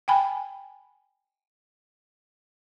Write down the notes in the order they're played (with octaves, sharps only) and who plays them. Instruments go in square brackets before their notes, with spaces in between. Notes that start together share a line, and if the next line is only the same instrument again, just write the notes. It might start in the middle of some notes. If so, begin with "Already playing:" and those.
[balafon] G5 G#5 B5